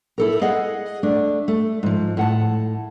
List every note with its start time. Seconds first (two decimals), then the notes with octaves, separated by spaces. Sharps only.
0.18 E4 A4 A#4
0.41 G#4 D#5 F5 F#5
1.03 A3 D4
1.48 A3
1.83 G#2 F3
2.17 A2 F#5 A5